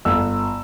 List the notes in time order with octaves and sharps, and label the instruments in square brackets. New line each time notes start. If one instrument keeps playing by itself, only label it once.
[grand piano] G1 E6